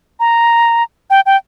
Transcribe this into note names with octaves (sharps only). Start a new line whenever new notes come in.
A#5
G5
G5